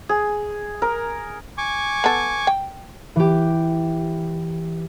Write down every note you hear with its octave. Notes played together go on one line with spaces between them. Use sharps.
G#4
A#4
G#5 C#6 D6
B3 A4
G5
E3 G4